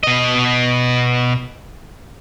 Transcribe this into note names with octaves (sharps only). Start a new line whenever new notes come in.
B2 D#5